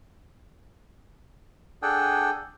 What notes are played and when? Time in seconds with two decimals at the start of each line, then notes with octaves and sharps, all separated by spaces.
1.82 D4 G#4 A4 F#5 G5